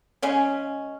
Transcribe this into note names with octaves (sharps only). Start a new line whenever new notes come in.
C#3 G#3 C#4